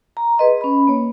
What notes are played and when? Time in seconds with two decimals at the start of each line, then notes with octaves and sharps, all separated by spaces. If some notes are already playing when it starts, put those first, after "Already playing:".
0.17 A#5
0.38 G#4 B4 D#5 C6
0.61 C#4 B5
0.87 A#3 C#5